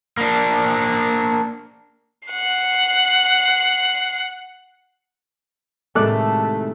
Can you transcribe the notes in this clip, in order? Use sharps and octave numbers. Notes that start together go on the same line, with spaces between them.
A#3 D4
F#5 C7
A2 C3 D#3 G#3 A3 A4 D6 F#6